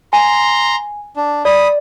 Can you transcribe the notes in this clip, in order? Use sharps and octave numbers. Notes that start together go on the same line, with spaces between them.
G#5 A#5 C6
D4
D5 B5 D#6